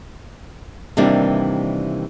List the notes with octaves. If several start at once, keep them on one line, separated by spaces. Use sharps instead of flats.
C3 D#3 E3 G3 A#3 D4